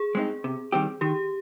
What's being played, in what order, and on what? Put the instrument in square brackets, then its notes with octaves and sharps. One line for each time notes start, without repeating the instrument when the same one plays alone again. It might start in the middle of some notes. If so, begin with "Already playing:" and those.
Already playing: [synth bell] G#4
[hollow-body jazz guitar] G#3 C4 D#4
C3
D#3 G3 C4 G4
[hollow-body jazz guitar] D#3 [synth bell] G4